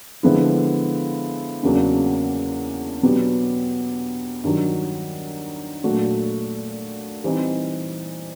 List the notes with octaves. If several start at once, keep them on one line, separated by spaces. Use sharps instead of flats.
D3 F3 G#3 B3 E4
E2 C#3 F#3 A#3 D4
B2 F#3 B3 D4 G4
G2 D#3 F#3
A#2 F#3 A3 D4 F#4
E3 G3 C4 D#4